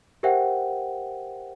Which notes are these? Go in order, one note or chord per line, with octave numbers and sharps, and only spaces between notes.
G4 A#4 C5 E5 F#5 G5